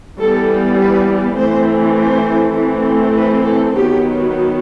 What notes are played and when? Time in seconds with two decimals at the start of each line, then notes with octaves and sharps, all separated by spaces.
0.19 E3 G3 B3 A4
0.78 B4
1.38 E3 A3 C4 C5
1.97 C5
2.57 E3 A3 C4
3.16 B4
3.45 A4
3.75 D#3 F#3 B3 G4